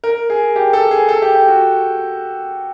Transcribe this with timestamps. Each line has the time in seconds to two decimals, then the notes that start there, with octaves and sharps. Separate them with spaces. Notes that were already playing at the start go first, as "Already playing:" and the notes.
0.04 A#4
0.30 G#4
0.56 G4
0.73 A4
0.91 G#4
1.09 A4
1.22 G4
1.35 G4
1.48 F#4